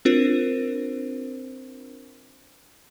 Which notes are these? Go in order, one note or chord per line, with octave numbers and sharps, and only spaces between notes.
C4 D4 F4 A#4 C5